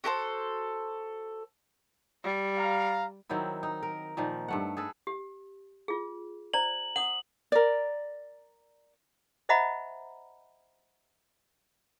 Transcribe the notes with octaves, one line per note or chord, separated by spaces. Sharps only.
F#4 G4 A4 C5
G3
F5 A#5
D#3 F#3 C4 E4
D#4
A#4
A#2 D#3 F3
G2 A3 F#5
G#4 A4 B4
G4
F4 G#4
C5 D5 A#5 F#7
F#5 D#6 F#7
A#4 D5
C5 D#5 E5 F#5 A#5 B5